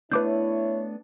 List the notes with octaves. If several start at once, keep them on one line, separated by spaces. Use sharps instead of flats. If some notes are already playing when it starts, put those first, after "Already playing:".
A3 B3 D4 E4 B4 C#5 D6 G6